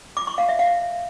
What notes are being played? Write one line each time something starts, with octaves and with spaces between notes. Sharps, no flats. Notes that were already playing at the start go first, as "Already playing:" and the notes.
D6
C#6
F5
E5
F5